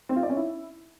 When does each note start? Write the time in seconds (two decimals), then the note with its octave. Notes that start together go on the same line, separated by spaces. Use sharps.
0.09 C4
0.16 F4
0.23 D5
0.30 C#4
0.36 E4